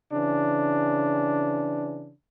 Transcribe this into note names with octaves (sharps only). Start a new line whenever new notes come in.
C#3 E3 D4